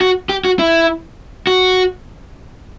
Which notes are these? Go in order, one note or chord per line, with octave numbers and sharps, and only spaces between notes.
F#4
G4
F#4
E4
F#4